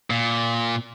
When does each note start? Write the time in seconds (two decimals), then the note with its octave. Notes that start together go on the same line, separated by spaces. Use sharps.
0.10 A#2